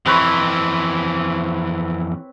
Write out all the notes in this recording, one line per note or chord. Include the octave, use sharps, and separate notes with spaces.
F2 E3 C4 B4 C#5